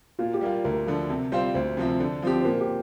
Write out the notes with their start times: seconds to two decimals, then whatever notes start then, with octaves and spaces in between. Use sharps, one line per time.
0.19 A#2 F4
0.34 G4
0.41 G3 A#3 F4
0.64 D2 A#4
0.87 D3 F3
1.09 C3
1.32 G3 C4 F4 C5
1.55 D2 C5
1.77 C3 F3 C4
2.00 D3
2.22 F3 C4 G4
2.41 C5
2.45 A#2 A#4
2.61 G4